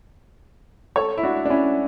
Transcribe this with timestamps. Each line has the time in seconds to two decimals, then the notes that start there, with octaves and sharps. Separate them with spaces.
0.96 A4 C#5
1.18 E4
1.23 D4 F#4
1.45 D4
1.50 C#4 E4